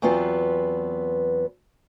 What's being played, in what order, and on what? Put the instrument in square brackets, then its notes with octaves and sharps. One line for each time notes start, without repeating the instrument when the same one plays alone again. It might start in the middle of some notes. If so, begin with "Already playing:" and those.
[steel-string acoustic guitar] E2 F#3 B3 C4 F4 B4